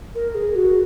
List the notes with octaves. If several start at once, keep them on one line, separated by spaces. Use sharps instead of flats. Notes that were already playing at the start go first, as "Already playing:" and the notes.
A#4
G#4
F#4